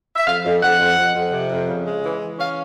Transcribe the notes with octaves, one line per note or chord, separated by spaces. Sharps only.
E5
F2 F5
F2
F2 F#5
F2
F2
F2
C3
F2
C#3
G#3
E3
E3
C#4 F5